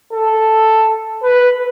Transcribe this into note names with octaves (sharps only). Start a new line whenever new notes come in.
A4
B4